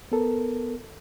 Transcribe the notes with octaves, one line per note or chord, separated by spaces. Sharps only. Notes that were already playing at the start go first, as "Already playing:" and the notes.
B3 A4 A#4